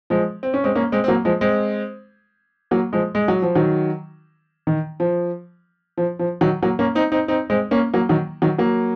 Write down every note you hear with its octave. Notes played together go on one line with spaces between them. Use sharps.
F3 G#3
C4
C#4
G#3 C4
A#3 C#4
G#3 C4
C4
F#3 A#3
F3 G#3
G#3 C4
F#3 A#3
F3 G#3
G#3
F#3
F3
D#3 F#3
D#3
F3
F3
F3
D#3 F#3
F#3 A#3
A#3 C#4
C4 D#4
C4 D#4
C4 D#4
G#3 C4
A#3 C#4
F#3 A#3
D#3 F#3
D#3 F#3
F#3 A#3